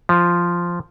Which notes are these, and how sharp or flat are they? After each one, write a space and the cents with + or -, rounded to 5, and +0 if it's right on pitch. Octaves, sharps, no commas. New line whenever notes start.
F3 -5